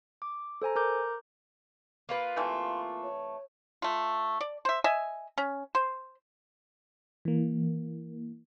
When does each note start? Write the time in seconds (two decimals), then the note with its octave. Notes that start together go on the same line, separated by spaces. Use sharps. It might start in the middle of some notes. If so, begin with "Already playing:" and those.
0.22 D6
0.62 A4 C5 G#5 A#5
0.76 A#4 A#5 D6 G6
2.09 A#3 F4 B4
2.36 C3 E3 A3 C6
3.03 C#5
3.82 A3 F4
4.41 D5
4.65 C5 E5
4.84 D#5 E5 G#5
5.38 C#4
5.75 C5
7.25 E3 A#3